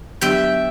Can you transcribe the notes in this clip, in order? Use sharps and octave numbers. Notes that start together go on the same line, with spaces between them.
D3 F#3 B3 D4 G4 E5 G5